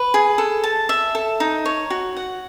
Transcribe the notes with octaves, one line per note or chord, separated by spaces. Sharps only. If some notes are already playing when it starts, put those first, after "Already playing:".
Already playing: B4
G#4
A4
A5
E5
A4
D#4
C#5
F#4
F#5